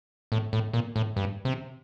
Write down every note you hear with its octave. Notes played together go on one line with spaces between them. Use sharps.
A2
A2
A#2
A2
G2
C3